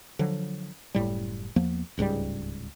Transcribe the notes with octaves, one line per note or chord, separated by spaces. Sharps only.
D3 F3 F#3
F#1 A2 G3
E2 F3 A#3 B3
D1 C#2 G#2 G3